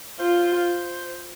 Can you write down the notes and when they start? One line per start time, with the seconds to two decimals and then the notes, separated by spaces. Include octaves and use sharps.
0.20 F4 C5